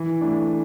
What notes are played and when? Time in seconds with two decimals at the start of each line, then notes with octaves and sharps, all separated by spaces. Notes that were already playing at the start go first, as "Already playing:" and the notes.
Already playing: E3
0.21 A3 D4